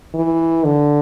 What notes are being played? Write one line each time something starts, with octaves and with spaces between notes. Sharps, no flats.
E3
D3